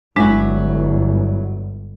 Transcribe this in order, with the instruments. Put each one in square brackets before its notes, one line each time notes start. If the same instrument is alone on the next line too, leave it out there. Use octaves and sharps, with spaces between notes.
[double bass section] G1 [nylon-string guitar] F#3 E4 F#4 [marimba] G#3 D4